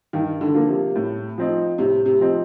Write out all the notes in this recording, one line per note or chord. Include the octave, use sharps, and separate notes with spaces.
G2 D#3
D3
F3 A#3 F4
C3
A2
F3 C4 D#4
A2 C3
C3
F3 C4 D#4